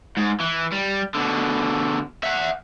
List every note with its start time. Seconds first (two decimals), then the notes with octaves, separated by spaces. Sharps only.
0.17 G#2
0.40 E3
0.72 G3
1.15 B2 D3
2.23 E5 F#5